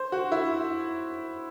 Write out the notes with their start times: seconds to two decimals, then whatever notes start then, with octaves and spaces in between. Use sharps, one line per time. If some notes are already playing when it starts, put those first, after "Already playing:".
Already playing: C5
0.12 F#4
0.32 E4